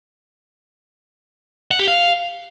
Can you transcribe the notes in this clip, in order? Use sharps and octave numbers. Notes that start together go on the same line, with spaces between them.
F#5
G4
F5